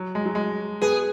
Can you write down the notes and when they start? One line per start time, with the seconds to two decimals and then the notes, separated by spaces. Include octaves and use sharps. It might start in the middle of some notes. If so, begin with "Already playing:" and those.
Already playing: F#3
0.15 G#3
0.25 F#3
0.35 G#3
0.82 B3 G#4